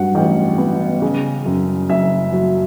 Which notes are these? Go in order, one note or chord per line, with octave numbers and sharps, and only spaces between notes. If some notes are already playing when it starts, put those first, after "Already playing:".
Already playing: G2 F#3 F#5
A1 G5
B3
C#3
F#2
F#1 E5
F#3